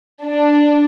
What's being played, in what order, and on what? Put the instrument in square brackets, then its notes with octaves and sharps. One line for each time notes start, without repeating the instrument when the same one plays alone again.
[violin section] D4